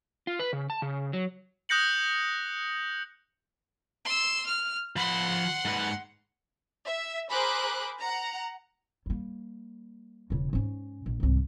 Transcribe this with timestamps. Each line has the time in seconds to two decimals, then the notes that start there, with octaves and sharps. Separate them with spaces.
0.27 F4
0.40 B4
0.53 C#3
0.70 A5
0.82 C#3
1.13 F#3
1.69 D#6 F#6 G6 A#6 C#7 F#7
4.05 C6 E6
4.46 F6
4.96 F3 F#5 B5 C6
5.65 G#2 B4
6.83 E5
7.31 G#4 A#4 C5 B5 D6 F#6
7.99 F#5 A#5
9.06 G3 A#3
10.30 E1 C#3
10.53 G#2 C#4
11.06 A#1
11.20 C2 G#2